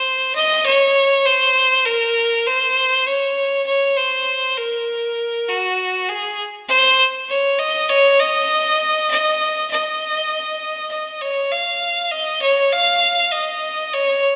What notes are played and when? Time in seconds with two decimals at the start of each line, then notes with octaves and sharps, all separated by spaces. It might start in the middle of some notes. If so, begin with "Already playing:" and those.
Already playing: C5
0.35 D#5
0.66 C#5
1.25 C5
1.86 A#4
2.47 C5
3.07 C#5
3.66 C#5
3.97 C5
4.58 A#4
5.48 F#4
6.09 G#4
6.68 C5
7.29 C#5
7.59 D#5
7.89 C#5
8.20 D#5
9.11 D#5
9.71 D#5
10.91 D#5
11.21 C#5
11.52 F5
12.11 D#5
12.42 C#5
12.73 F5
13.32 D#5
13.93 C#5